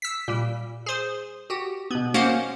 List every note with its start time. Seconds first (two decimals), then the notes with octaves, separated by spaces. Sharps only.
0.02 E6 B6
0.28 A#2 G3
0.86 G#4 C5
1.50 F#4 G4
1.91 B2 B3
2.14 A#3 C#4 F#4 C5 F5 F#5